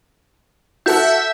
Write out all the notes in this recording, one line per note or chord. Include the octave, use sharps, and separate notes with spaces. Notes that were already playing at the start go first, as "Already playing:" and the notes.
F#4 A4 E5 F#5 G6